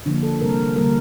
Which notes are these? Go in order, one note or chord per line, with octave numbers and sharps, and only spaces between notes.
D3 F3 A#3 D4
A4
C3 G3 A#3 A#4
D3 G3 A#3 A#4